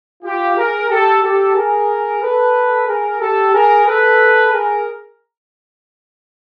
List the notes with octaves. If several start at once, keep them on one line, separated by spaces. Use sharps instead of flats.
F4 G4
G#4 A#4
G4 A4
G4 A4
G#4 A#4
A4 B4
G#4 A#4
G4 A4
G#4 A#4
A4 B4
G#4 A#4